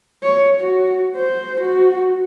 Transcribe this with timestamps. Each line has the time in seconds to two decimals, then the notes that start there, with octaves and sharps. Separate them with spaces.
0.23 C#5
0.60 F#4
1.16 C5
1.61 F#4